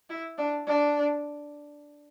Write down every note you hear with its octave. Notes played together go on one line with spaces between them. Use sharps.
E4
D4
D4